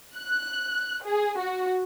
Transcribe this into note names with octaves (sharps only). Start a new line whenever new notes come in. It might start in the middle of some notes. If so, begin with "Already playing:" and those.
F#6
G#4
F#4